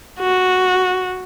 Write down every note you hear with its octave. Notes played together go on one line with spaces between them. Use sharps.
F#4